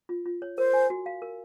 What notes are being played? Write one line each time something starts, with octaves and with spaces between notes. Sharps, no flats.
F4
F4
C#5
A#4 C5
G#5
F#4
F5
A#4